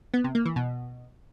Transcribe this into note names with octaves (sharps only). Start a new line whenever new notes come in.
B3
C3
A#3
E3
B2